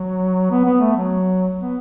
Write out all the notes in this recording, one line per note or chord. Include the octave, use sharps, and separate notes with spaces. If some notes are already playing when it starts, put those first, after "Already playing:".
Already playing: F#3
B3
B3
A3
F#3
B3